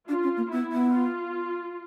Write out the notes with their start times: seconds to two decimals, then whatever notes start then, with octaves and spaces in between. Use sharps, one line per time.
0.08 D4 F4
0.23 C#4
0.37 A#3
0.51 B3 E4
0.72 B3
0.93 F4